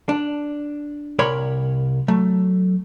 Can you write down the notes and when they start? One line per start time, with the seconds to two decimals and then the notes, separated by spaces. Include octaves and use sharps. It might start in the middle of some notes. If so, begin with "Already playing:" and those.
0.09 D4
1.19 C2 A#4 C#5 D5 B5 C6
2.08 F#3 A3